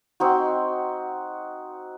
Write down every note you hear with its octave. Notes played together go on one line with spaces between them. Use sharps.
C4 D#4 F#4